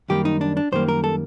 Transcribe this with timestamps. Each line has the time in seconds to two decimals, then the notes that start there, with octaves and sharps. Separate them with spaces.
0.09 F#2 D#3 G3 A#3 G4
0.25 D#4
0.41 D4
0.57 D4
0.72 F#2 D#3 G3 A#3 C5
0.89 A#4
1.04 A4